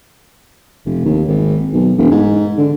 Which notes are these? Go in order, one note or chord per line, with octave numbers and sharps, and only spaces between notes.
F1
D#2
G#1
B1
E1
G#2
D3